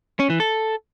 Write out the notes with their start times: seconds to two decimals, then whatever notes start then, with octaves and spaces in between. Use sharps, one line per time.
0.20 C#4
0.30 E3
0.40 A4